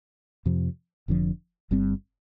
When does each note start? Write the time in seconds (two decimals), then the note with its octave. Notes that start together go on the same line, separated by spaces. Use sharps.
0.46 F2 C3 F3
1.08 F1 F2 D3 F3
1.71 G1 G2 G3 C4